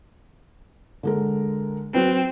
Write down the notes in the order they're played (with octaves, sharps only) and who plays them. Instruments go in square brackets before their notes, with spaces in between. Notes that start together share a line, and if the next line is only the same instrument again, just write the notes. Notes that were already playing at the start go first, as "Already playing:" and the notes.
[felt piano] D3 G#3 A#4
[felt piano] F#3 B4 [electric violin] C4